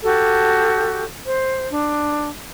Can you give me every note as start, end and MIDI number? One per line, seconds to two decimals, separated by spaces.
0.03 1.04 66
0.03 1.04 67
0.03 1.04 69
1.26 1.67 72
1.70 2.27 62